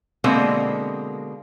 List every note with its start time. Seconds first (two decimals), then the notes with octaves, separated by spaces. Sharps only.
0.24 B2 D3 G#3 A#3 C4